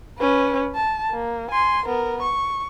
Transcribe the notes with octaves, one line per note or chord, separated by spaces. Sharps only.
C#4 B4
A5
A#3
G#5 C6
B3 A#4
C#6